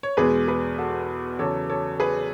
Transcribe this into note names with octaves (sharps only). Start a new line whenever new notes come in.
C#5
E2 B2 G#3 G#4 B4
G#4 B4
F#4 A4
E2 C#3 F#3 A4 C#5
A4 C#5
G#4 B4